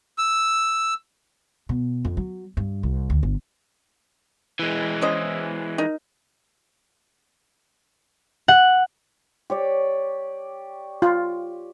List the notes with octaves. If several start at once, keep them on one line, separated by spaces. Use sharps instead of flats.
E6
B2
F2
F#3
G2
C2
D2
G1
E3 G#3
C#4 C5 D#5
D#4 A#4
F#5
G4 C#5 D5
F4